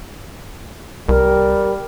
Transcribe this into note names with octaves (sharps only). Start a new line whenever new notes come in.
C2 G3 A#4